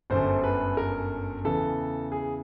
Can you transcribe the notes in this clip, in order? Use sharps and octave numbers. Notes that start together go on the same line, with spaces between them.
G1 F#2 D3 C5
B4
A#4
E2 C#3 E3 A4
G#4